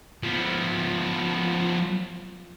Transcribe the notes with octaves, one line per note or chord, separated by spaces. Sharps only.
F3 B3